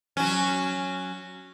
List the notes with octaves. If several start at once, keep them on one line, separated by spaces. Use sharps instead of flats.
F#3 C#4